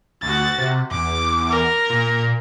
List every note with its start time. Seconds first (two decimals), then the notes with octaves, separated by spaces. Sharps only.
0.22 D2 F#4 A6
0.58 C3
0.91 E2 D6
1.50 A#4
1.90 A#2